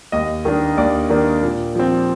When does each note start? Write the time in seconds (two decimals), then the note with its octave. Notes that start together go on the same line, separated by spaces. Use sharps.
0.12 D#2 D#5
0.45 D#3 A#3 D4
0.78 D#2 D5
1.10 D#3 A#3 D4
1.43 A#2
1.75 F3 C4